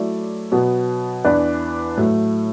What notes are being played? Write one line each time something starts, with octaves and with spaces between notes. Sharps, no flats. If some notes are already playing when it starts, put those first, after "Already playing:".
Already playing: F#3 A3 E4 D5
B2 F#3 B3
E2 E3 D4 B4 D5
A2 F#3 A3